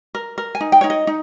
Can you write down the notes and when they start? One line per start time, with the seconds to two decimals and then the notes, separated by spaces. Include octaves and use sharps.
0.15 A#4
0.38 A#4
0.55 G#5
0.61 D#4
0.72 G5
0.81 D#4 C#5
0.90 D#5
1.07 D#4